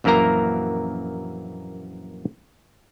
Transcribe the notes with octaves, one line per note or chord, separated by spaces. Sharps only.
A#1 F#2 E3 A#3 A#4 A#5